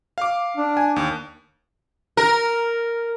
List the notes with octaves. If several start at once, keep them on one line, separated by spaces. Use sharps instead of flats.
F5 D6
D4
G#5
D#2
A#4